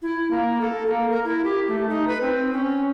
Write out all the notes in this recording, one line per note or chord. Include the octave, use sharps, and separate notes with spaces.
E4
A#3
A4
A#3
A#4
E4
G4
A3
D#4
B4
C4
C#4